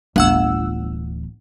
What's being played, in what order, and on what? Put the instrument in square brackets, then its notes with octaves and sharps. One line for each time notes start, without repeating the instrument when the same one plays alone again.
[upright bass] D1 E3 [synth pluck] G1 F#5 E6